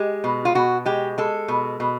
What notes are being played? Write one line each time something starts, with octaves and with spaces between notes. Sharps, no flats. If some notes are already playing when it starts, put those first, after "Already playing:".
Already playing: G#3 G4
B2
F4
B2 F#4
G#3 G4
G#3 A4
B2
B2